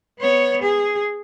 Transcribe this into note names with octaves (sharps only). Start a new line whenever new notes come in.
B3 C#5
G#4